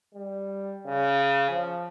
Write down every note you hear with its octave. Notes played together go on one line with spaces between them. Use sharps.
G3
C#3
F3